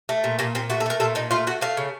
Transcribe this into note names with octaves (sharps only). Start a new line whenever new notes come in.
A3
A#2
A#2 A#3
A#2 C4
A3 F#4
A4
A3 A#4
A#2 A4
A#2 D#4
A3 F4
A3 F#4
A3 F5
C#3